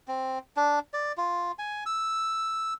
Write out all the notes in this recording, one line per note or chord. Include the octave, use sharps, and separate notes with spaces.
C4
D4
D5
F4
G#5
E6